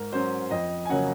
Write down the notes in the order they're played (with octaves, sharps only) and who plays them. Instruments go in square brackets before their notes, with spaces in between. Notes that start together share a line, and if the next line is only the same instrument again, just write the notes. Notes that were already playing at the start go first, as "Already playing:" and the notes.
Already playing: [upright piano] G#2 A#4
F#3 C#4 C5
F2 D#5
G#5
C#3 F#3 A#3 C#4 F#5